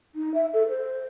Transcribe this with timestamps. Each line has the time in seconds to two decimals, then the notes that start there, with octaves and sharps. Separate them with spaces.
0.15 D#4
0.34 E5
0.53 A4
0.68 C5